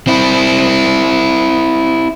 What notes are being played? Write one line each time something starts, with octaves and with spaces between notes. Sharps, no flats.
C4 E4